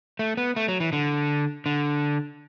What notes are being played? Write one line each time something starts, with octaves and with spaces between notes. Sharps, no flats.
A3
B3
A3
F#3
E3
D3
D3